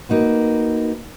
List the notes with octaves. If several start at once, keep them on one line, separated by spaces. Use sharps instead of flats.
A#3 D#4 F#4 B4